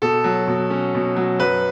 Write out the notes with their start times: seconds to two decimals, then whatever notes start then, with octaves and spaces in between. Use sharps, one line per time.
0.02 B2 A4
0.24 F#3
0.47 B2
0.70 C#4
0.95 B2
1.16 F#3
1.40 F#2 B4